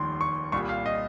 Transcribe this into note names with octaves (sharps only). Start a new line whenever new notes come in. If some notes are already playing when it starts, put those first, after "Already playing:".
Already playing: F1 D#2 D#3 G3 C6
C#6
C2 A#2 G3 C#6
F5
D#5